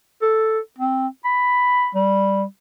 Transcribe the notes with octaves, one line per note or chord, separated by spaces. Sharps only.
A4
C4
B5
G3